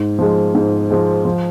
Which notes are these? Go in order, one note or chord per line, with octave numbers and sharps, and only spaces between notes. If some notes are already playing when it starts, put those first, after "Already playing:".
Already playing: G#2
F3 G#3
G#2
F3 G#3
F3